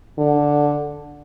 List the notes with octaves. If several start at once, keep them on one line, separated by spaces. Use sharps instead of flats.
D3